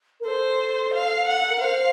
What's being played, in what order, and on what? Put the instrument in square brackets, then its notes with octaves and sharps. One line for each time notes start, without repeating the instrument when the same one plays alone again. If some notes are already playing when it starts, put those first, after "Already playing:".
[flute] A#4
[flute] A4 [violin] C5
[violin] F5
F#5
[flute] A#4
[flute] C5 [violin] F5